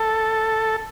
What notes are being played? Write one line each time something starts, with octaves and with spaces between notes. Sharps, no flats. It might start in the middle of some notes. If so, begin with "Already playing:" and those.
Already playing: A4